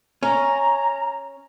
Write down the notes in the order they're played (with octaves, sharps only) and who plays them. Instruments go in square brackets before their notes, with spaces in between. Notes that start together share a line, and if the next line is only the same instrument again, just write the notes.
[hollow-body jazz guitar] C#4 [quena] A#5